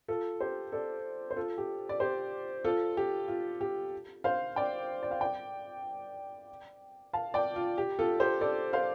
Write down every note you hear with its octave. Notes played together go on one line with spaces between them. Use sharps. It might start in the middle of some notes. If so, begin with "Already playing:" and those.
F4 A4
G4 C5
A4 D5
C5
F4 A4
G4
D5
G4 C5
F4 A4
G4
F4
G4
C5 F5
D5 G5
D5
F5
D5 G5
F5 A5
D5 G5
F4
G4
F4 A4
G4 C5
A4 D5
C5 F5